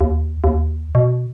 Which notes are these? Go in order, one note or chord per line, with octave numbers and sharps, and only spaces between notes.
D#2
D#2
B2